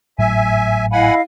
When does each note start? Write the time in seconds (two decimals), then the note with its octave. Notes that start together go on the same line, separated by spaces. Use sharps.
0.19 G#1 A2 F#3 E5 G#5
0.92 E4 D#5 F5 F#5 G#5 B5